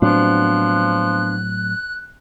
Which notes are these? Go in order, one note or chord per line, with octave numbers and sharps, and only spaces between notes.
A2 F3 F#3 B3 C4 D4 F#6